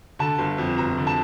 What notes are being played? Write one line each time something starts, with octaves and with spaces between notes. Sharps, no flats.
D3 A5
G1
F2
G1 A#5
D3
A5